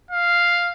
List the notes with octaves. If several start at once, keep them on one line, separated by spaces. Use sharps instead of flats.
F5